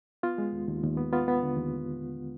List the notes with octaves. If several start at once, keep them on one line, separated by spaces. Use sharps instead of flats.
B3 F4
G#3
D#2
D#2
D#2
B3
B3 F4
B3
D3
D#2